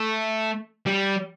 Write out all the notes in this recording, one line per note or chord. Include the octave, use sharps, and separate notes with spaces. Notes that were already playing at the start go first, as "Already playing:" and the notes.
Already playing: A3
G3